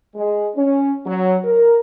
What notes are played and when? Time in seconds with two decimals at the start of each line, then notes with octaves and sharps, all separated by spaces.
0.16 G#3
0.56 C#4
1.06 F#3
1.44 A#4